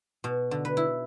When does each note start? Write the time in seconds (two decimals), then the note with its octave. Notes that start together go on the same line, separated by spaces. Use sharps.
0.24 B2
0.51 D3
0.65 B4
0.77 E4